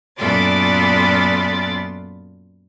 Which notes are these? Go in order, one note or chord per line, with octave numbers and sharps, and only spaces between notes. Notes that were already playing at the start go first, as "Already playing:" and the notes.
F#2 A#2 B3 F4 A4 D5